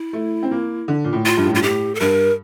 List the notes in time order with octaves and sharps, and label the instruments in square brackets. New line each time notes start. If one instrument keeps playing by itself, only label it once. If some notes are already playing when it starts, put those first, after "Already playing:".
Already playing: [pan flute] E4
[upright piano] A3
C4
A#3
D3
A#2
A2
[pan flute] F4
[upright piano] G2
A2
[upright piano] G2 [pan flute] F4
[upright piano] A2 [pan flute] G4
[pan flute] A4
[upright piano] G2 [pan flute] A#4